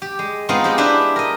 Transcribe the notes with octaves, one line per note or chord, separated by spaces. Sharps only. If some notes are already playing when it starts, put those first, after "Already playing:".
G4
G#3
G#3 B3 C4 D#4 F4
C4 G4
D4 E4 G4 B4
A#4 D#5